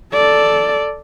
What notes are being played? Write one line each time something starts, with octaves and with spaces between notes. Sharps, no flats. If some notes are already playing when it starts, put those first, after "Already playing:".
A4 D5